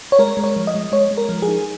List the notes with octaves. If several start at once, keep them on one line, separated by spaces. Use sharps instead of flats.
C#5
G#3 A#4
G#3
C#5
F3
D#5
G#3
G#3 C#5
G#3
A#4
F3
G#4
D#4